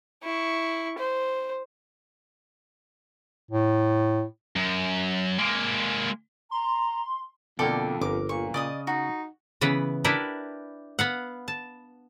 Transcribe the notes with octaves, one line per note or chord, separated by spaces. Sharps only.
E4 C#6
C5
A2
F#2
G#3 A#3
A#5 C6
F2 B2 D3 A#3 A4 D5 G5
G1 A#4 D6
A#2 C#6
C#3 D5 D#5 D#6
D#4 F#4
C#3 E3 B3 B4
D4 E4 G4 A#4 B4 D5
B3 F5 F#5
A5